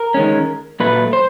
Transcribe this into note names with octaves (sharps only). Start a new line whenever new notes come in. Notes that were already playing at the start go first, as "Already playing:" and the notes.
Already playing: A#4
D#3 G#3 C#4
A#2 F#3 A3 B4
C5